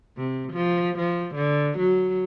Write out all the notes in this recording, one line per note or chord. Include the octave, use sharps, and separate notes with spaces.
C3
F3
F3
D3
F#3